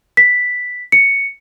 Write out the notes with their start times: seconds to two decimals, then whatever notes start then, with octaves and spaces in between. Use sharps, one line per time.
0.17 B6
0.92 C#7